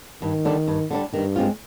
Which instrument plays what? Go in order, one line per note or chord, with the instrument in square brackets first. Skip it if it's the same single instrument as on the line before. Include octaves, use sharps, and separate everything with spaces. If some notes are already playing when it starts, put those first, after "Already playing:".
[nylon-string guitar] G2 [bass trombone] D#3
[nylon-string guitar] D3 G3 D4
G2
D3 G3 D4
[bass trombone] G2 [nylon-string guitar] D#3
[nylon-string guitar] G#3 C4 F4